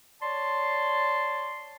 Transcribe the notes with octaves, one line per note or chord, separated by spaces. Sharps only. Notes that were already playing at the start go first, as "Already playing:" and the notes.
C#5 D5 A5 C6